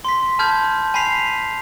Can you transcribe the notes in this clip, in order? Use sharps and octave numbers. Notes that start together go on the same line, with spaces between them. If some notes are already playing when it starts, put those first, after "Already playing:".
C6 B6
A5 B5 F6 G6 G#6
G#5 B5 B6 C7 F7